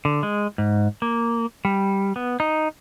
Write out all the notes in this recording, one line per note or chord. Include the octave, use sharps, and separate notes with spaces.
D3
G#3
G#2
A#3
G3
B3
D#4